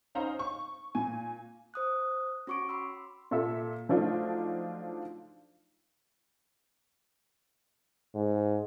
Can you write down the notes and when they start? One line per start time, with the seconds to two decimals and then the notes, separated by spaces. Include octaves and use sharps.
0.15 C4 C#4 D#4 C5 F5 A#5
0.39 C#6
0.95 A#2 G#5
1.74 C5 D#6 F#6
2.47 C#4 F#4 C#6 D6 D7
2.69 B5 C6 E6
3.31 A#2 A4 E5
3.89 F3 F#3 A3 D4 D#4 F4
8.15 G#2